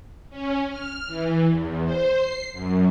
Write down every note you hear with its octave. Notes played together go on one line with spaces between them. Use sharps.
C#4
F6
E3
E2
C5
C7
F#2